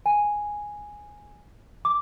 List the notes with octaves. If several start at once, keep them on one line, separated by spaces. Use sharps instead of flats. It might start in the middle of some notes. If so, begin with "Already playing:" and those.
G#5
D6